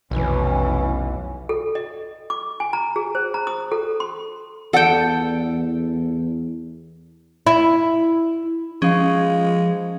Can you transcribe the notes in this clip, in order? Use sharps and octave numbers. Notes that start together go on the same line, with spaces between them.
F1 B1 E3 C#4
A4
D#5
D6
G#5
A#5
G#4
C5
A#5
D#6
A4
C6
E2 A4 D5 F#5 G5
E4
F3 G#3 C#4 D#4 F5